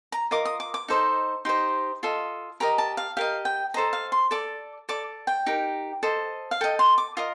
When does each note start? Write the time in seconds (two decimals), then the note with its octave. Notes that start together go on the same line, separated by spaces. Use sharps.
0.12 A#5
0.31 F4 A#4 D#5 D6
0.45 D#6
0.60 D6
0.74 D6
0.88 D#4 A4 C5 D#5
1.45 D#4 G4 C5 D#5 C6
2.03 F4 A4 D#5
2.60 G4 A#4 D#5 A#5
2.78 A5
2.97 F5
3.17 G4 A#4 D#5 F5
3.45 G5
3.74 A4 C5 D#5 A#5
3.93 F5
4.12 C6
4.31 A4 D5 D6
4.89 A4 D5 D6
5.27 G5
5.46 D#4 G4 A#4
6.03 A4 C5 D#5
6.51 F5
6.61 A4 D#5 G5
6.79 C6
6.98 D6
7.17 F4 A#4 D#5 D#6